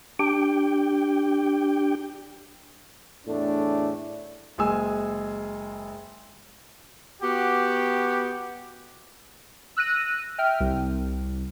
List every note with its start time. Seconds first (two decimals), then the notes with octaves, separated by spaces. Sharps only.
0.19 D4 G4 G5
3.28 E2 A2 A3 D4
4.58 F#1 G#3 G#5 E6
7.22 B3 F#4 G4
9.77 E6 F#6 A#6 D#7
10.38 E5 G5 F6
10.60 C2